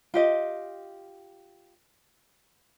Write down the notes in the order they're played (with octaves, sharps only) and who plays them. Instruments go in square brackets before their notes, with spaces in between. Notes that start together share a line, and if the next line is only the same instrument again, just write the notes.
[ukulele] F4 G4 D#5